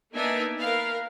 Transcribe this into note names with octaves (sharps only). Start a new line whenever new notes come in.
A#3 B3 D4 D#4 E5 G#5
A#4 B4 F5